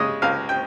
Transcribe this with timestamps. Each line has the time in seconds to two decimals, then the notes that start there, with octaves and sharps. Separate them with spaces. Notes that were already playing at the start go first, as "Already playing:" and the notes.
Already playing: C#3 G#3 D#5
0.22 C#2 F5
0.49 G5